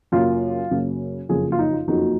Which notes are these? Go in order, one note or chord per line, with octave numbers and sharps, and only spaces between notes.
F#2 C#3 F#3 A#3 F4
F#2 C#3 F#3 A#3
F#1 F2 C#3 F3 A#3 F4 G#4
F4
D#4
F4
F#1 F2 C#3 F3 A#3 D#4 F#4